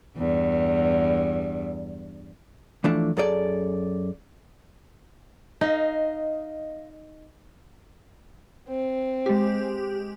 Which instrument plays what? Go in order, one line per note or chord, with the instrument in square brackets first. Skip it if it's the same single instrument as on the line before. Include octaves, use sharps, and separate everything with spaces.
[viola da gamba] E2 G2
[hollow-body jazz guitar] E3 F3 A3 D4
F#2 G#4 A4 D5
[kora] D#4 [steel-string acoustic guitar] D#5 F5
[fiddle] C4
[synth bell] G#3 G4